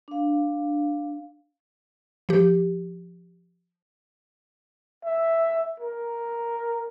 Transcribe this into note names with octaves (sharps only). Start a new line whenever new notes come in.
D4 F5
F3 G4
E5
A#4